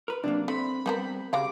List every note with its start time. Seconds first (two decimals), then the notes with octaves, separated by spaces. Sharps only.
0.08 A#4 B4
0.24 C3 F#3 A#3 D4
0.48 A3 C4 B5
0.86 G3 B3 C4 G#4 A#4
1.33 C#3 G3 F#4 F5 D6